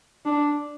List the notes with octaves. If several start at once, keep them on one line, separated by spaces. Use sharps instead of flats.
D4